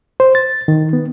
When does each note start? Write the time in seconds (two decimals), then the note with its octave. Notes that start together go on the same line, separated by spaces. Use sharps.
0.20 C5
0.35 A6
0.68 D#3
0.93 B3